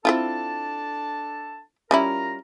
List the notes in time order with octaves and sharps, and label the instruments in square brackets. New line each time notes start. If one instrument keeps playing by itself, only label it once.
[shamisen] C4 E4 F4 [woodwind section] D4 A4 A5
[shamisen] G3 C#4 E4 [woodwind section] F4 A#4 A#5